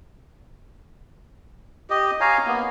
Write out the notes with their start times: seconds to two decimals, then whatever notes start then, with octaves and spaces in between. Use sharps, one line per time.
1.90 G4 D#5
2.21 C#5 F5 G#5 A#5
2.47 A#3 B3